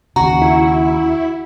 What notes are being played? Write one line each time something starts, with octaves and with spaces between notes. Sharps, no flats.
D#2 C#3 F#4 A#5
E4